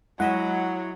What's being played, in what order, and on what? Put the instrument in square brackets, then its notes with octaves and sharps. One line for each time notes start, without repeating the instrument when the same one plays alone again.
[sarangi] F#3 [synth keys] G#3 D#5 E5 [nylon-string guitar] E4 [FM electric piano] F#5